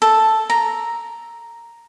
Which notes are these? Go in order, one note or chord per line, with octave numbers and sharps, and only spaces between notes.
A4
A#5